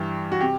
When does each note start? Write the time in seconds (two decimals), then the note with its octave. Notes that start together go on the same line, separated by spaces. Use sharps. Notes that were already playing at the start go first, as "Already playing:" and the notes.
Already playing: G2 E3 G3 G4
0.32 F#4
0.41 C3 G4